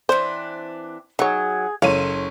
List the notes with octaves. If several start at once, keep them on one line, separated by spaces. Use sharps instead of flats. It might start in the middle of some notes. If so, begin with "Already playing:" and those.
E3 C4 D4 C5
F#3 D#4 G#4 C#5
F#1 A4 C#5 F5 C6 D#7